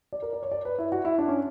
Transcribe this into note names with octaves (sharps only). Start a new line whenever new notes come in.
D5
A#4
D5
C#5
D5
B4
E4
F#4
E4
D4
C#4